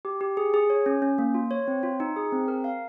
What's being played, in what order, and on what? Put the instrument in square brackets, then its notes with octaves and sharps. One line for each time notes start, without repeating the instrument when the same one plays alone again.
[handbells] G4
G4
G#4
G#4
C#5
C#4
C#4
A#3
F4
C#5
C4
F4
D#4
G#4
C4
A#4
F5